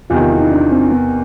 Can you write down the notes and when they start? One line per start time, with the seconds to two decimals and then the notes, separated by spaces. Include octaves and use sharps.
0.10 E2 C3 D#3 F4
0.21 F4
0.31 E4
0.41 D#4
0.52 D4
0.72 C4
0.91 B3